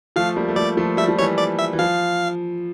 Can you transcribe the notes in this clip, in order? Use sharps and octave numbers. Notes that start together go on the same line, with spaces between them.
F3 A3 F5
G3 A#3
A3
G3 A#3 D5
F3 A3
G3 E5
F3
E3 G3 C#5
D5
E5
E3
F3 F5